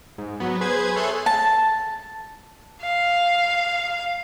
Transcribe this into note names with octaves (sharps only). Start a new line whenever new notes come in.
G#2
F#3 B3
G#4 B4 C5 G#6
A4 C#5 E5 C6 F#6 G#6
A5
F5